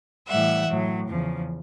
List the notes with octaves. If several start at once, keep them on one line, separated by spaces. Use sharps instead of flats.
A2 E3 G3 E5 F#5
A2 F#3
E2 C#3 F3